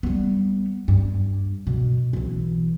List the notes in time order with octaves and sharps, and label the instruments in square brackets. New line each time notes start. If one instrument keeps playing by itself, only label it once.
[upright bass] G3 B3
G2
B2
B1 E3